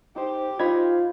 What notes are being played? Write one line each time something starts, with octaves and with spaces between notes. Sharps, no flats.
D#4 G4 C5
D#4 F4 C5 B5 G#6